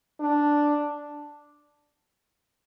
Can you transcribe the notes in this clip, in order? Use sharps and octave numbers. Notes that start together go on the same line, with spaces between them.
D4